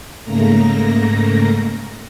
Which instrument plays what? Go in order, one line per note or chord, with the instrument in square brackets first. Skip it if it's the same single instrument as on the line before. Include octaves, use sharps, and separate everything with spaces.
[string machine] G#2 C#3 A3 A#3 A#5 A#6